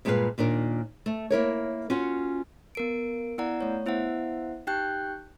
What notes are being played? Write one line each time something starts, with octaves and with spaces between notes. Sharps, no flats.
G2 A#2 G#3 C4 B4 F5
D#2 A#2 D4 A#4
A3
A#3 E4 A#4 C#5
C#4 F4 F#4 F#5
B3 A#4 D7
B3 E4 D5 F#5 A#5
A3 C#5
B3 E4 C5 E5 F#5
D#4 G4 G5 F#6 G6